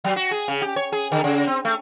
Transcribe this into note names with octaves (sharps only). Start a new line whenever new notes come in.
F#3
F#4
G#4
C#3
G4
C#5
G#4
D3
C#3
C4
A3